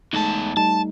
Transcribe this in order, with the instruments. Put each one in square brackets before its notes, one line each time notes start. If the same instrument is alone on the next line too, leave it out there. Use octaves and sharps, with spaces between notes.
[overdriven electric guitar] E2 A5 [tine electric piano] G#3 A3 D#4
[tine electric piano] G3 A3 D#4 [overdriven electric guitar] A5